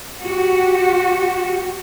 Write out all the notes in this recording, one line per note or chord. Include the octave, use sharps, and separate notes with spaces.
F#4 G4